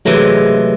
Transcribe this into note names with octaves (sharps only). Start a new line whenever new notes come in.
C3 E3 F#3 G#3 A3